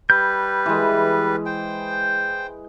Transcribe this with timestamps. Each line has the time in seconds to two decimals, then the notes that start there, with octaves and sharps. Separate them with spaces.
0.10 G3 B4 G6
0.66 E3 G#3
1.46 C5 G5